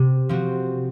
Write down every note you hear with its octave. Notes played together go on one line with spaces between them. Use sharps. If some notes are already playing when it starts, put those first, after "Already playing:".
Already playing: C3
F3 C4 F#4